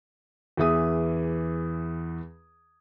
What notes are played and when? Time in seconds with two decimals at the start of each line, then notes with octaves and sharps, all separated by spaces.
0.57 E2 E3 G#4 E5 D#6